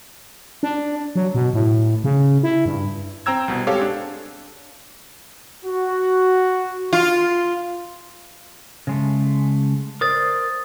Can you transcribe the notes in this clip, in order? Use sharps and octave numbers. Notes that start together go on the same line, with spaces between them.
D4
F#3
B2
A2
C#3
E4
G2
C4 G5 A#5 E6 G#6
C2 B2
G#3 C4 G4 A4 C#5 F5
D4
F#4
F4
C#3 G#3 A3
A#4 C5 D5 D#6 A6